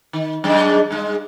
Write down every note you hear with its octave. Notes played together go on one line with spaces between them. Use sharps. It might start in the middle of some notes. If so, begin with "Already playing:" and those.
D#3
F#2 G#3 D4
G2 G#3